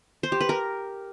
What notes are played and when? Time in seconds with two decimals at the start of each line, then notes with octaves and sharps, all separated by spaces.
0.23 C5
0.32 G4
0.41 B4
0.49 A#4